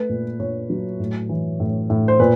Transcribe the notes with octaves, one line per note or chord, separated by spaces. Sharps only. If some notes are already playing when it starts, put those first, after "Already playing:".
Already playing: A3 B4
A#2
A#2 C#5
F#3
A2
E3
A2
A2
C5
A#2 B4